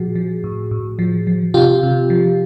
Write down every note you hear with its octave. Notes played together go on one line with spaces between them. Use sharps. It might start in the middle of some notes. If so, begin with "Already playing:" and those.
Already playing: A#2 F3 F#4 G#4
F3
A2
A2
F3
F3
C3 F4 G4
C3
F3